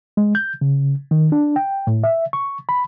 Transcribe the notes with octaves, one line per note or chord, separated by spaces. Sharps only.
G#3
G6
C#3
D#3
D4
G5
A2
E5
C#6
B5